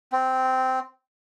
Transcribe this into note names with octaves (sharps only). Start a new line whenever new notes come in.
C4